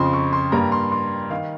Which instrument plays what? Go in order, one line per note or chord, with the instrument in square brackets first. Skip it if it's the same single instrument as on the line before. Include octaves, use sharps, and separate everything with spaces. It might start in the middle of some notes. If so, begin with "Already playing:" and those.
Already playing: [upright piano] F2 C#3 F3 C6
C#6
C6
G2 G3 A#3 A#5
C6
C6
D#3 F5